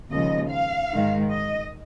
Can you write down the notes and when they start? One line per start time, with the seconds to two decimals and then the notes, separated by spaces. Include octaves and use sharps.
0.11 D#2 C#3 F3 G#3 D#5
0.51 F5
0.92 G#2 D#3 G#3
1.31 D#5